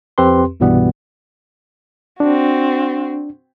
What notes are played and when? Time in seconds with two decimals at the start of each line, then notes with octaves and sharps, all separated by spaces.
0.18 F2 C4 G4 B4 C6
0.60 C2 G2 B2 E3 G3 B3
2.20 C4 D4 F#4